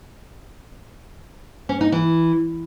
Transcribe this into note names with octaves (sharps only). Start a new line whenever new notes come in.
C#4
D#4
E3